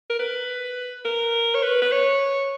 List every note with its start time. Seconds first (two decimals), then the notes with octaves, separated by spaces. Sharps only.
0.10 A#4
0.19 B4
1.05 A#4
1.55 C#5
1.63 B4
1.82 B4
1.92 C#5